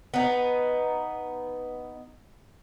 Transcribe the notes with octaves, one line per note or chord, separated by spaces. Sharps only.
B3 D#4